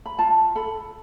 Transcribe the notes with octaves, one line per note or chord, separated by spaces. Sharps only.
B5
F4 A5
A4 B5